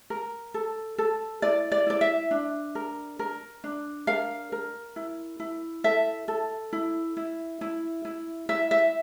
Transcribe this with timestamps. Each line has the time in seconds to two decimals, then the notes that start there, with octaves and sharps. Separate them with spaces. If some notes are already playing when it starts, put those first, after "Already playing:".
0.10 A#4
0.54 A4
0.98 A4
1.42 E4 D5
1.72 D5
1.87 E4 D5
2.01 E5
2.31 D4
2.75 A#4
3.19 A#4
3.64 D4
4.07 A#4 F5
4.52 A#4
4.96 E4
5.40 E4
5.84 A4 E5
6.28 A4
6.73 E4
7.17 E4
7.61 E4
8.05 E4
8.49 E4 E5
8.71 E5